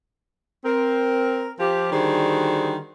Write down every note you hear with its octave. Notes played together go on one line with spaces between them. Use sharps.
C4 A#4
F3 G4
D3 D#3 G3 F#4 G#4 C5